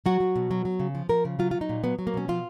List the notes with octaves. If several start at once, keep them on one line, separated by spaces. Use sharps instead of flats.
F#3 F#4
F#3
B2
F#3
F#3
C#3
F3
F3 A#4
C#3
F#3 F4
F#3 F4
D#4
A#2
F#3 B3
F#3
A#3
B2 C#4
F3 F4